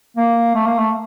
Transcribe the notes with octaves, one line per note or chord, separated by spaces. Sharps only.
A#3
A3
A#3
A3